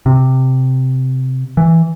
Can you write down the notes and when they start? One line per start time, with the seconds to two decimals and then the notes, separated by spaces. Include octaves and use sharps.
0.06 C3
1.57 E3